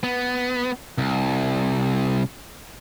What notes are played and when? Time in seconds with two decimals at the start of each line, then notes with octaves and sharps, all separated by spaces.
0.03 B3
0.98 C2